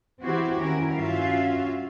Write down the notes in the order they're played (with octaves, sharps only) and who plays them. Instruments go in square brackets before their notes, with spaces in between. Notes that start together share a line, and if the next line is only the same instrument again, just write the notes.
[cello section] E3 C4 E4 F#4 G4 C5
D#2 C#4 E4 A#4
G2 C#4 F4 F#4 E5 F5